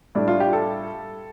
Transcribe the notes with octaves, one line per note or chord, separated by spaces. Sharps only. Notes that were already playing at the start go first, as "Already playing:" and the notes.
A2 G3 D4
F4
G4
A4